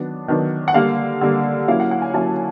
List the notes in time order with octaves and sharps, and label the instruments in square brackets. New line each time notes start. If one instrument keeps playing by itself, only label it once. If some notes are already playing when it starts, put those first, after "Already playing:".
Already playing: [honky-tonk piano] D#3 F#3 B3 D4
D#3 F#3 B3 D4
F#5
D3 G3 A#3 F5
D3 G3 A#3
F#3 A#3 C#4 E4 F5
F#5
F#5
G#5
F#3 A#3 C#4 E4 A5